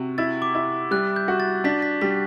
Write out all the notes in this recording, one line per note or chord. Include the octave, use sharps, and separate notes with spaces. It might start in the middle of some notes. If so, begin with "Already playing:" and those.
Already playing: C3 F#4
E4 A6
D6
E4
G3 F#6
G6
F#4
A6
D4 B6
B6
G3 B6